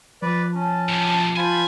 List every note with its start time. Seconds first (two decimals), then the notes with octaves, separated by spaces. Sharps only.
0.22 F3 B4 D5
0.55 C#4 A5
0.89 A2 C3
1.37 F4 C5 G#5 A5 B5